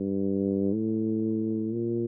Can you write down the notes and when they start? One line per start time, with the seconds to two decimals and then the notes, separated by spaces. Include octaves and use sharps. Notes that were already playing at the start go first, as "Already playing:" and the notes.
Already playing: G2
0.74 A2
1.73 A#2